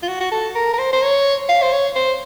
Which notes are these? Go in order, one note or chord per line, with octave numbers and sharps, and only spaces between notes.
F4
F#4
F#4
A4
A#4
A#4
C5
C5
C#5
F5
C5
C#5
C5